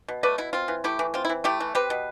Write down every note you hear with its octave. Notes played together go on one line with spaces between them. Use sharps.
B2
A3 B4 D5
B2 E4
C4 F4
E3
A3 E4 G4
E3
C4 F4
E4
E3
A3 E4 G4
E3
C4 G4 B4
B2